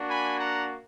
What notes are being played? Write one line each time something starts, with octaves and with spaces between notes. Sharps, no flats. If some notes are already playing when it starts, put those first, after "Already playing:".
Already playing: A#3 D4 F#4
G#5 B5
F#5 A#5